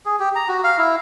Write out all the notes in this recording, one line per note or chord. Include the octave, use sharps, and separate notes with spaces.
G#4
G4
A#5
F#4
F5
E4